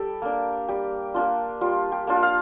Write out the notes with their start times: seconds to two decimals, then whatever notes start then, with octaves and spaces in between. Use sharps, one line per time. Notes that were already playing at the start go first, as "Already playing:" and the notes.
Already playing: G3 G4 A4
0.22 A#3 D4
0.68 G3 G4
1.14 A#3 D4 F4
1.61 G3 F4
1.92 G4
2.07 A#3 D4 F4
2.23 F5